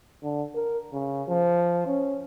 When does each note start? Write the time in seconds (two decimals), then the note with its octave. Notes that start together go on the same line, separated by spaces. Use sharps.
0.23 D3
0.56 A#4
0.93 C#3
1.29 F3
1.87 C#4